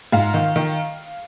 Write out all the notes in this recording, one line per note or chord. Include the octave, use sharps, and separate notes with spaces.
G#2 F5
D#3
D#3